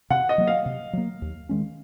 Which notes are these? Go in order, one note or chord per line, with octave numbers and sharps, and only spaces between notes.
C3 F#5
D#5
F#3 A#3
F5
C3
F#3 A#3
D#2
D#3 G#3 C#4